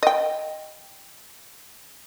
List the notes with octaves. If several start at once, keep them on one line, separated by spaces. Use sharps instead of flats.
D#5 G5